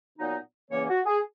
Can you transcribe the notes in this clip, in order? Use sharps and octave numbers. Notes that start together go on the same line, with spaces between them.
A#2 F#3 B3 D#4
E2 C#3 E3 A#3 C#4 C#5
F#4
G#4